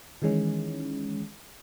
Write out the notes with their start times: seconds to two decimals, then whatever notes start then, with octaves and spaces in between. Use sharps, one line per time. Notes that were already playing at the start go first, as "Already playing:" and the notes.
0.22 D#3 E3 G#3 C#4